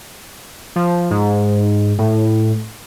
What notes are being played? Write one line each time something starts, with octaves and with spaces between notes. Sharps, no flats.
F3
G#2
A2